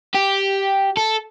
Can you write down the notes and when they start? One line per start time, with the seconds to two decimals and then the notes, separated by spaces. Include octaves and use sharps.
0.14 G4
0.97 A4